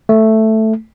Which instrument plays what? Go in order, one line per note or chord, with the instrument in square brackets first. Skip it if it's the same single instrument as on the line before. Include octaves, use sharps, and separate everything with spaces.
[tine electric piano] A3